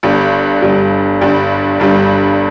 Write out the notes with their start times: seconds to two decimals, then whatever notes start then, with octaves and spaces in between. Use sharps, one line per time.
0.03 G1 G2 G3
0.62 G1 G2 G3
1.21 G1 G2 G3
1.80 G1 G2 G3